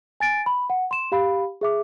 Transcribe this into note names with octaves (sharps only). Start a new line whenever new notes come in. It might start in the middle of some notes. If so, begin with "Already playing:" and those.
G#5 A6 D7
B5
F#5
C6 E7
G4 F5 B5
G#4 E5 D6